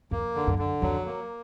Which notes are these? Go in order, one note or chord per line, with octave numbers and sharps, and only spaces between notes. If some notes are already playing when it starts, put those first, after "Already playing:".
F2 A#3
D3
F#2
D3
F2 F#3
A#3